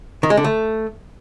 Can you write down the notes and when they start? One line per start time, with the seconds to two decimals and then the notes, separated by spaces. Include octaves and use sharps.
0.23 D#3
0.30 G#3
0.37 D3
0.44 A3